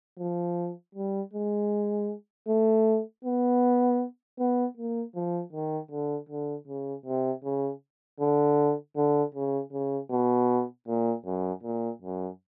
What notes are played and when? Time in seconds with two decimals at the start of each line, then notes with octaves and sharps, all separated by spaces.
0.19 F3
0.95 G3
1.34 G#3
2.48 A3
3.24 B3
4.39 B3
4.77 A#3
5.15 F3
5.52 D#3
5.91 D3
6.29 D3
6.68 C#3
7.06 C3
7.44 C#3
8.20 D3
8.96 D3
9.35 C#3
9.72 C#3
10.11 B2
10.88 A#2
11.25 F#2
11.63 A#2
12.02 F#2